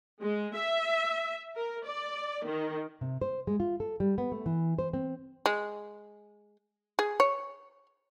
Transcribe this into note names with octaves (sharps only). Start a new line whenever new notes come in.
G#3
E5
A#4
D5
D#3
C3
C5
G#3
F4
A4
G3
B3
A3
E3
C5
C4
G#3
G#4
C#5